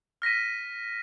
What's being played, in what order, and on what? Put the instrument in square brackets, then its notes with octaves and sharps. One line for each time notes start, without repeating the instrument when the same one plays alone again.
[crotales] F6 A#6 B6 D#7